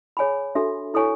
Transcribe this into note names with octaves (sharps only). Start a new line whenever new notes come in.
G#4 C#5 G#5 B5
D4 F#4 A4 E5
E4 A4 C#5 G#5 C#6